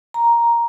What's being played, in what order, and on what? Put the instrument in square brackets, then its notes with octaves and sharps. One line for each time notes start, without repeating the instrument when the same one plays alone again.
[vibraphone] A#5